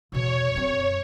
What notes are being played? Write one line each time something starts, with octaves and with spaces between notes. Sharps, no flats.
E2 B2 C#5
F#2 C4